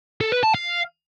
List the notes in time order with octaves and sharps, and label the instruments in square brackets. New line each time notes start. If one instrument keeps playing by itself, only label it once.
[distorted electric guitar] A4
B4
A5
F5